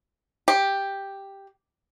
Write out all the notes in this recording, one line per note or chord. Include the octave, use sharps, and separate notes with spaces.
G4